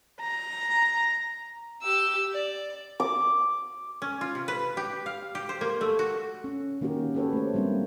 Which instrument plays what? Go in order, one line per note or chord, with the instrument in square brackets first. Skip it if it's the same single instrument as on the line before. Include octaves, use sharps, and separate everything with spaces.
[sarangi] A#5
[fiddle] G4 E6
D5
[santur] D6
[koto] C#4
F4
C3
B4
G4
F5
G4
C5
A#3
A3
F#4
[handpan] C#4
D#3 A#3 C#4 F#4 G4 A#4
C#4 G4 A4 B4 C#5
A3 C5
G3 G#3 A#3 C4 D4